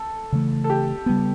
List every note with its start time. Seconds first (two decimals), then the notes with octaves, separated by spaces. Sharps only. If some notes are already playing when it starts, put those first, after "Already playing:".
Already playing: A4
0.32 C#3 E3 A3
0.64 A4
0.70 G4
1.06 C#3 G3 B3